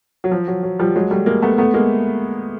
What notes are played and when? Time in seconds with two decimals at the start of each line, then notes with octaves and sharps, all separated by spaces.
0.24 F#3
0.32 F3
0.48 F#3
0.63 F#3
0.79 F3 G3
0.96 F#3 G#3
1.11 G3 A3
1.26 G#3 A#3
1.42 A3 B3
1.58 A3 B3
1.74 G#3 A#3